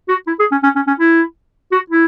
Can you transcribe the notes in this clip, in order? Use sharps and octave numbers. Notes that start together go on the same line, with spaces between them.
F#4
E4
G#4
C#4
C#4
C#4
C#4
E4
F#4
E4